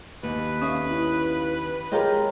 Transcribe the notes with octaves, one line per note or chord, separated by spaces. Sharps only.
D#2 B4
C#4 E5 F5 D#6
E4
G#3 F4 G4 G#4 A#4 C#5 D#5 A#5